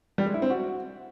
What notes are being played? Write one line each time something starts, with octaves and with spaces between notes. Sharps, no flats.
G3
G#3
E4
C4
F#4